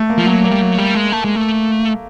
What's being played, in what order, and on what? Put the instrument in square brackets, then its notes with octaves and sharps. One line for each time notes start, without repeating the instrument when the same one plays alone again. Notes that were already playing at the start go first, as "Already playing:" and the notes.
Already playing: [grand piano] A3
A#3
[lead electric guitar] F3
[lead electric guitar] F#3 [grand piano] A#3
[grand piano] A#3
[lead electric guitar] G3
F#3
G3
G#3
A3
G#3
A3